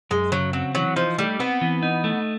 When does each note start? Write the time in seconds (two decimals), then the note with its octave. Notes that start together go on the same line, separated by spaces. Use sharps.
0.11 F#2 G#3
0.32 C#3 F#3
0.53 F#3 C4
0.75 E3 F#3
0.96 F3 D#4
1.18 G3 A3
1.39 B3 C4
1.61 E3
1.83 D#4
2.04 A3